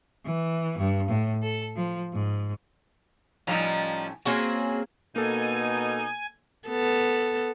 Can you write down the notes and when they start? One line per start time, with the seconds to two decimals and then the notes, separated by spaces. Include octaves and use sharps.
0.24 E3
0.77 G2
1.07 A2
1.42 A4
1.75 F3
2.12 G#2
3.47 A2 F3 G3 C#4 D#4 A#5
4.26 A#3 C4 C#4 F#4 G#4
5.16 B2 A#3 D#4 A4 G#5
6.68 B3 A4